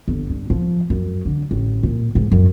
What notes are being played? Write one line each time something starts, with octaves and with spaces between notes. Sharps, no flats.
G1
G2
F3
F#2
D3
A1
A#2
G#2
F#2